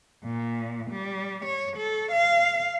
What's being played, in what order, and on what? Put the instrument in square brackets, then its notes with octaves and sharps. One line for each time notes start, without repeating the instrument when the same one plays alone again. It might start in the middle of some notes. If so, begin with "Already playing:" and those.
[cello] A#2
G3
C#5
A4
F5